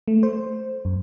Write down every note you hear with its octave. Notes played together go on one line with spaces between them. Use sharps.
A3
C5
F#2